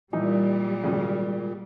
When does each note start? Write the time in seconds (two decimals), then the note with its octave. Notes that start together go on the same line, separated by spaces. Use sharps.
0.13 A#2 E3 G3 D#4
0.83 G#1 C#3